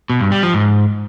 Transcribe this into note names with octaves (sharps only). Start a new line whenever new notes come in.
B2
G2
G3
F3
G#2